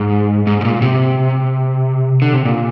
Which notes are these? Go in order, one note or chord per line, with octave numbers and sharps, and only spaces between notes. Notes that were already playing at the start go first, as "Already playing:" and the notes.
Already playing: G#2
G#2
G#2
A#2
C3
D3
C3
A#2